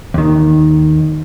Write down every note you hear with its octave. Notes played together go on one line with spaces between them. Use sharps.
D#2 D#3